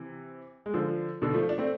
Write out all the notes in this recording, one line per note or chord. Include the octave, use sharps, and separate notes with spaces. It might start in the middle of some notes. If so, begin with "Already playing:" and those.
Already playing: C3 E3
G#3
D3 F3
B2 D3
F3 A3
D4
A3 C4